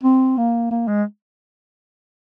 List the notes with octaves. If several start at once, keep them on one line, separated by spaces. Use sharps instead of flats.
C4
A#3
A#3
G#3